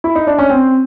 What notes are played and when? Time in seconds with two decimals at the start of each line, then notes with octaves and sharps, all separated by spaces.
0.04 E4
0.15 D#4
0.27 D4
0.39 C#4
0.50 C4